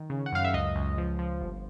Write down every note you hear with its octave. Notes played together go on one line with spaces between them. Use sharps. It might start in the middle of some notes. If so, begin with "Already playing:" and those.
Already playing: D#3
C#3
F#5
F#2 F5
E5
C#2 D#5
C#2
F3
F3
G1